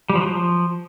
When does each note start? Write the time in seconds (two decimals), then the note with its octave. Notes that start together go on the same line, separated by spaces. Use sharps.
0.10 G3
0.15 F3
0.21 F#3
0.26 F3